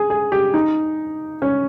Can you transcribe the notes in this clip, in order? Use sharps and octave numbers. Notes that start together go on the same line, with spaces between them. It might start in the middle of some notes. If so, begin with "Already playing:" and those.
Already playing: G#4
G#4
G4
D#4
C#4